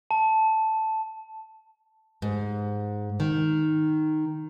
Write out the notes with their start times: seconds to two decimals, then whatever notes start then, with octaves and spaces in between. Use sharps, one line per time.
0.11 A5
2.22 G#2
3.20 D#3